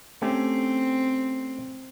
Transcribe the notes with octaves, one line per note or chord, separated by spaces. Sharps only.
A3 C4 C#4 G4